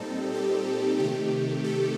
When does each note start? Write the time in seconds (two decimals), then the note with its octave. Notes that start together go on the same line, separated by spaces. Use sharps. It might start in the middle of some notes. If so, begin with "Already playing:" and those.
Already playing: A#2 G3 C4 D#4 A4
0.34 G4
1.00 C3 D#3 A3 G4
1.64 A4